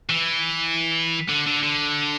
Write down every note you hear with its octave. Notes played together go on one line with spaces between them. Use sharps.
E3
D3
D3
D3